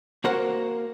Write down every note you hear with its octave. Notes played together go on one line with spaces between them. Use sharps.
A#3 F#4 A#4 C5 F#5